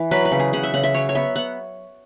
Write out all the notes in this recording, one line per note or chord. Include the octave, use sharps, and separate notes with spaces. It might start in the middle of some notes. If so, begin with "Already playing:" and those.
Already playing: E3
F#3 B4
B4
C#3
G#4
C#3 F#5
E5
C#3 F#5
E5
F#3 C#5
C#5
B3 E5
B3 F#5